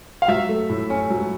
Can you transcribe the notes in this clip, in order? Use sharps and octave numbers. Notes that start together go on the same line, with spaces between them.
F5
F#3 E5
A3
A2
C#4
F#3